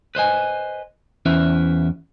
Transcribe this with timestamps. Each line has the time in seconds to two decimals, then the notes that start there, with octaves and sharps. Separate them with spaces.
0.15 B4 C5 D#5 G#5
1.26 E2 C#4 E4 B4 C5 E5